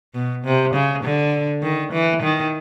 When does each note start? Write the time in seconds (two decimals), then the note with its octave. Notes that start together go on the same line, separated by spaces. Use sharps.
0.14 B2
0.45 C3
0.74 C#3
1.04 D3
1.63 D#3
1.92 E3
2.22 D#3